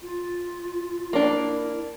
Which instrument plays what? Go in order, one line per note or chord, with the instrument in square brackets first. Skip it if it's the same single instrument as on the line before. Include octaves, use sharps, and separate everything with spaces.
[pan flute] F4
[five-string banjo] A#3 D4 [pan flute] E4